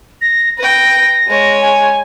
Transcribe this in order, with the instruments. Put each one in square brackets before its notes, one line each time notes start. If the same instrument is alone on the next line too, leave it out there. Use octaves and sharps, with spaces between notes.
[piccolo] A#6
[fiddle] B4 G5 [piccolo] A#6
[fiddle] G#3 C#5
[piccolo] G#5